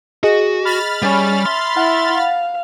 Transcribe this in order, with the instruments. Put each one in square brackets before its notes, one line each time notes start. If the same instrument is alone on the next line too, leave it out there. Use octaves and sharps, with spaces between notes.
[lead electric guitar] F#4 [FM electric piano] G#4 D#5
[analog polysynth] B5 F6 A6
[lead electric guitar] G3 [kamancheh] C#4
[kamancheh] E5 [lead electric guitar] C6
[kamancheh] E4 E5 [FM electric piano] F#5
[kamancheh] F5